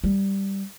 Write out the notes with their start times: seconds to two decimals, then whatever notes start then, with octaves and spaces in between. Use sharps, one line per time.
0.04 G3